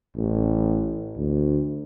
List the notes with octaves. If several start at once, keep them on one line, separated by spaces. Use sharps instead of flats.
A1
D2